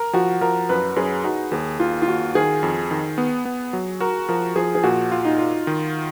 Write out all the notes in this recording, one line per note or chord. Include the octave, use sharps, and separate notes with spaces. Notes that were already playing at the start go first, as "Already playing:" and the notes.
Already playing: A#4
F3 F#4
F3 A#4
F#2 B4
F#2 G#4
D#4 F#4
D#2 G#4
D#2 F4
F4
D#2 F#4
D#3 G#4
F2
D#3
B3
B3
F#3
F#4 A#4
F3 A#4
F3 G#4
G#4
A#2 F#4
F4
D#4
F4
D#3